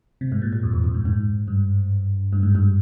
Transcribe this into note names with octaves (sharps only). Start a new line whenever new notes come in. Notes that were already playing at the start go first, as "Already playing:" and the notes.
C3
G#2
A#2
A#2
F2
E2
F2
G#2
G#2
G2
G2
G#2
G2